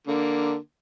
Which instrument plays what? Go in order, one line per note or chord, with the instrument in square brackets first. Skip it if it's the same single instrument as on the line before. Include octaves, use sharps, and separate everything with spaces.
[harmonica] D3 A#3